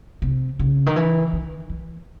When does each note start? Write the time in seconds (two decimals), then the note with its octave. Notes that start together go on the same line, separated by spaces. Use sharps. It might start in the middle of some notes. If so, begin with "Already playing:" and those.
0.22 C3
0.59 C#3
0.86 D#3
0.96 E3
1.33 D#3
1.69 E3